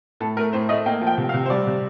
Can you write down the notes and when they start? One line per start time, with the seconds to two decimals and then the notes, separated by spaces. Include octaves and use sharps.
0.20 A2 A4
0.37 A3 A#4
0.53 A2 C5
0.69 A3 D#5
0.86 A#3 G5
1.01 F3
1.07 G5
1.18 C3
1.29 F5
1.34 C3
1.46 C5
1.50 G3 D5
1.67 C3